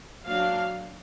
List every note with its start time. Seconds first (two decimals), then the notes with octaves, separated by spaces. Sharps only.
0.24 F#3 A#3 D4 F5